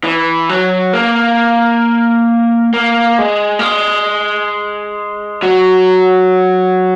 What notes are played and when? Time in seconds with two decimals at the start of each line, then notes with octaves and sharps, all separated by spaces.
0.04 E3
0.49 F#3
0.93 A#3
2.73 A#3
3.19 G#3
3.59 A#3
3.64 G#3
5.42 F#3